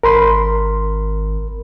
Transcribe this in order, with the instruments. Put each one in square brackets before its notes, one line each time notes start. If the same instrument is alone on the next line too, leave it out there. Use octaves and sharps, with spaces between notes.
[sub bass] G#1 [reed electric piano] A#4 B5 C6